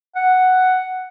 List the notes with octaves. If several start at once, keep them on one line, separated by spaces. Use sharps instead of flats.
F#5